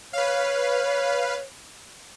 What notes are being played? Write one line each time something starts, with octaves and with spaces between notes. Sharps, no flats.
B4 C#5 F5